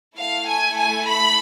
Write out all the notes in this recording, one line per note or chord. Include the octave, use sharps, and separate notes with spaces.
A3 E4 A4 F5
G#5
G#5
B5